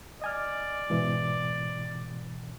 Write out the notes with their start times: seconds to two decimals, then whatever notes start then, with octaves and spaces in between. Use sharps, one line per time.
0.22 D5 D#5 G#5 F6
0.90 G#2 B2 E3